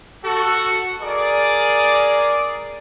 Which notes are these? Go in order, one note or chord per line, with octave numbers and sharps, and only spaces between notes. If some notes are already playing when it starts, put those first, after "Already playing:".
F#4 A4
G#4 A#4 D5